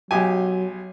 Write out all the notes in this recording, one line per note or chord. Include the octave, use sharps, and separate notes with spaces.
B1 F#3 G4 G#5